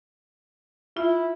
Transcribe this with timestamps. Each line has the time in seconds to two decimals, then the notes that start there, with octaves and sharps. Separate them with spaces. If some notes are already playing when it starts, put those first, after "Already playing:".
0.97 E4 F4